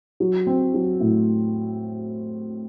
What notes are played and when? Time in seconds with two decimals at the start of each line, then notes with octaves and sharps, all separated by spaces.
0.20 F#3
0.47 C4
0.74 F#3
1.00 A2